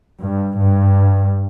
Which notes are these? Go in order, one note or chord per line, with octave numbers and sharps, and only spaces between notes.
G2
G2